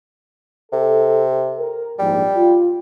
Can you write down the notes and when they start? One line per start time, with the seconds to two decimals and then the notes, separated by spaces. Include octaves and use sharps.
0.72 C3 A4
1.58 A#4
1.99 A#1 G#2 G3
2.36 F4